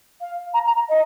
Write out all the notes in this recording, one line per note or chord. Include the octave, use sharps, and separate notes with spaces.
F5
A#5
A#5
D#5